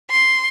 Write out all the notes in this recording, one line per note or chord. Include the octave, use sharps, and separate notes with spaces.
C6